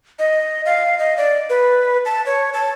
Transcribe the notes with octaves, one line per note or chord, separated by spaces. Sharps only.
D#5
F5
D#5
D5
B4
A5
C#5
A5